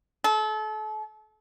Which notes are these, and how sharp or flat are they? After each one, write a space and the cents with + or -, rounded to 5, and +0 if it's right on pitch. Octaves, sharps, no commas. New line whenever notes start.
A4 -35